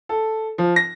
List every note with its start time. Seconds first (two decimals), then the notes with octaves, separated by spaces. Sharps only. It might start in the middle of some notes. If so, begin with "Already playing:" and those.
0.09 A4
0.58 F3
0.76 A#6